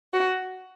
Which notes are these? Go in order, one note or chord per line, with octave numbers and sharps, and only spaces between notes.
F#4